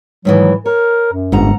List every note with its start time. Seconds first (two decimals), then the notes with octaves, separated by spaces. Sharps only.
0.25 G#2 D#3 E3 F#3
0.66 A#4 C#5
1.13 F#2
1.32 G1 G#2 F#5 A#5